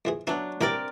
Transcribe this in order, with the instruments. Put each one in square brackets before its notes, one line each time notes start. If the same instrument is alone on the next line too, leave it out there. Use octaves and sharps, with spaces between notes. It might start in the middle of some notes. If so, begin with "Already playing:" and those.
[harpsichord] F2 E3 G#4
[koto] F#3 D4 [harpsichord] B3 C#4 E4
[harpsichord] C2 E3 G4 [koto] C4 A#4 D5